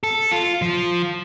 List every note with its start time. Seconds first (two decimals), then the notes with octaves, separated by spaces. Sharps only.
0.03 A4
0.31 F4
0.62 F3